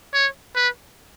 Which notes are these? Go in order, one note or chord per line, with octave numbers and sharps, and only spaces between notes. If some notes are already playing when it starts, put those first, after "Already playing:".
C#5
B4